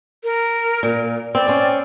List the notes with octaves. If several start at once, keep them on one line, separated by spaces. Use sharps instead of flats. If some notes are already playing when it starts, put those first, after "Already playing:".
A#4
A#2
C4 D5
C4 C#4